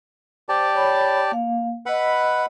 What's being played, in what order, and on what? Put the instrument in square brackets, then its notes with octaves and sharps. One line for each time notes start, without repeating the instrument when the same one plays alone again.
[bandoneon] G4 D5 A5 [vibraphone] C5
[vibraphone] C#5 B5
A#3 F5
[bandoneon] B4 F#5 B5 [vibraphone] D#5 E6